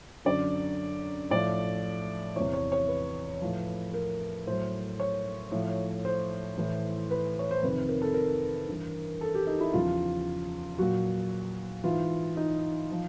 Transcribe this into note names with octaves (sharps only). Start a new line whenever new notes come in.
F#2 D3 F#3 D5
A2 F3 D5
E2 C3 E3 C#5
C#5
C#5
B4
A2 F3
A#4
A2 F#3 C5
C#5
A2 F3
C5
A2 E3
B4
C#5
C5
F2 C3 D#3 B4
A#4
A4
A#4
G2 E3
A4
G4
D#4
E4
E2 C#3 F3 F4
A#2 F#3 F#4
G#2 E3 F4
D#4
F3